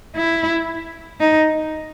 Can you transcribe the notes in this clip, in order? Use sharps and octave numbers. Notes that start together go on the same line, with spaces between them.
E4
D#4